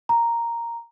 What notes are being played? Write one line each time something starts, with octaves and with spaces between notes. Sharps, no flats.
A#5